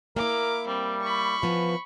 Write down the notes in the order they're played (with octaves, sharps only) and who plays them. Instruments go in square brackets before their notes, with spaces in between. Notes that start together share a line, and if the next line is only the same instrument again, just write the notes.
[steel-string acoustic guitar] A#3 E4 [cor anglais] A#4 [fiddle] D6
[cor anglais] G3 [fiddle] C4
[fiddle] B5 C#6
[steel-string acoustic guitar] E3 F3 B3